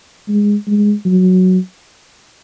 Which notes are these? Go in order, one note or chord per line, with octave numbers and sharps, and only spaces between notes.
G#3
G#3
F#3